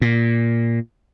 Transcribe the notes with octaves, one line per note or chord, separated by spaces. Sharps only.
A#2